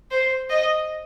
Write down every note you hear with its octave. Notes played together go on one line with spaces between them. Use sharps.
C5
D#5